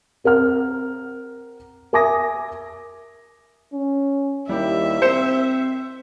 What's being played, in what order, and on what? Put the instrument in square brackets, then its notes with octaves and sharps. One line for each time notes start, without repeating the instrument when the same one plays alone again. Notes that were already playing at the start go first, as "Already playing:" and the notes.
[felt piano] C4 A#4 F#5 F6
A#4 E5 G#5 D6 D#6 A#6
[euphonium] C#4
[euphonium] D#2 [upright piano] G3 E4 G4 [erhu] E5
[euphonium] C4 [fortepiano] C5 [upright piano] C#7 E7